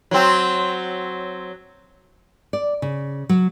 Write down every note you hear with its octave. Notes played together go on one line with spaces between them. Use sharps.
F#3 C4
D5
C#3
F#3